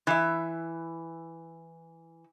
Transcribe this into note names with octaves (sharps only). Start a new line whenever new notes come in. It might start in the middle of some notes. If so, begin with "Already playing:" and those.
E3 E5